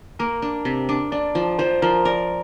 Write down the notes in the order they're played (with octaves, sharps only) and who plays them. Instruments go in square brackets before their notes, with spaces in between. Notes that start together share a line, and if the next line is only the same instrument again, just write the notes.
[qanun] A#3 [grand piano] A#4
[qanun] D4
C3
D4
[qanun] D4 [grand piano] D5
[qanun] F3
[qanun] F3 [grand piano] C5
[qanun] F3 [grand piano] A#4
[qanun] A#4 [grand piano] D5